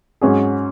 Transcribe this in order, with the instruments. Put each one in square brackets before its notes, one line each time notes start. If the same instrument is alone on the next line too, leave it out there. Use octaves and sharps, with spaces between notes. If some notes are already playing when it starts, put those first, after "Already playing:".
[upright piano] G#2 F#3 C#4 G#4